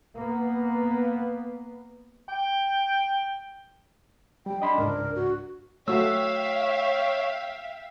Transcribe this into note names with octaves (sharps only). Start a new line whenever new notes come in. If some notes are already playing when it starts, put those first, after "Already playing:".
A#3 B3
G5
G3 G5
D4 D#5 B5 C6
C#2 G#2 D4 A#4
F#4
A3 F#4 C#5 E5 F5 G5 E6